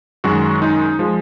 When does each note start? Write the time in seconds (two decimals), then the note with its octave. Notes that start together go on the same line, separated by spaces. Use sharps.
0.24 F#2 D#3 G#3 F#4
0.62 D#4
0.99 F3 G#3